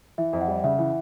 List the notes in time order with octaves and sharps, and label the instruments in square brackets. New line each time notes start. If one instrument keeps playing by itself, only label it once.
[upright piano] E3 [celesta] E5
[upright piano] F2
[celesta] F#5
[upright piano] G3
[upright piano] C#3 [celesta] E5
[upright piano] E3